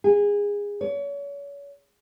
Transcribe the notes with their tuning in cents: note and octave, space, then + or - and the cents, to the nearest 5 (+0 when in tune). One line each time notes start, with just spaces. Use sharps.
G#4 -25
C#5 +35